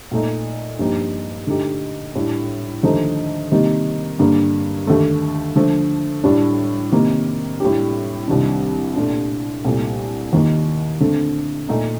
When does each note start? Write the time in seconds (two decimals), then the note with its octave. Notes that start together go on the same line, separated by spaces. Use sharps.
0.11 A#2 A3 D#4
0.79 G2 F3 A#3 D#4 G4
1.47 D3 A3 D#4 G4
2.15 A2 G3 D4
2.83 D#2 D3 F3 A3 D#4
3.51 C3 D#3 G3 A#3 D#4
4.19 G2 D3 G3 A#3
4.87 D#2 D3 A3
5.56 D3 F3 A3
6.24 A2 G3 D4
6.92 C3 D#3 A#3
7.60 A2 G3 D4 G4
8.28 C2 C3 D#3 G3 D4
8.96 A#2 A3 D4 F4
9.64 C2 A#2 A3
10.33 D#2 D#3 A#3 F4
11.00 D3 A3 C4
11.69 A#2 A3 D#4